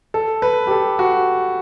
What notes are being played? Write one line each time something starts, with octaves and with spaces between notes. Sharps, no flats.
A4
B4
G4
A4
F#4